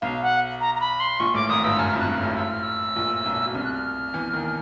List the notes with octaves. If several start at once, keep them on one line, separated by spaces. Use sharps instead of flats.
B1 B2 F5
F#5
A#5
A#5
B5
C6
A#1 A#2 C#6
A1 A2 D6
G#1 G#2 D#6
G1 G2 E6
F#2 F6
F2
F#6
F#2
F6
A1 A2
E6
F6
E6
A#1 A#2
B1 B2
B2
C2 C3 F6
F#6
F6
E2 E3
D#2 D#3